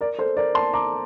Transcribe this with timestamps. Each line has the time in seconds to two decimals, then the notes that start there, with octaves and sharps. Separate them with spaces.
0.01 A#4 D5
0.19 A4 C5
0.37 A#4 D5
0.55 A5 C6
0.74 A#5 D6